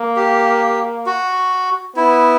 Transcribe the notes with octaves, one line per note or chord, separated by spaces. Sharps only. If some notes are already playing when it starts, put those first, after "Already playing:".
Already playing: A#3
G4
F#4
B3 E4